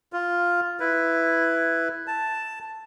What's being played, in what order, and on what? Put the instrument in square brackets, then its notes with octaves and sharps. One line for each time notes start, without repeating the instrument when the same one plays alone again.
[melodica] F4
E4 B4
A5